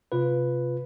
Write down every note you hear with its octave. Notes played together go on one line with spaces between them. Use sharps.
C3 F4 B4